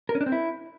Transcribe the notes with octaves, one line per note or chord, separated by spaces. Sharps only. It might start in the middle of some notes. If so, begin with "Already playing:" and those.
A#4
C#4
D4
C4
E4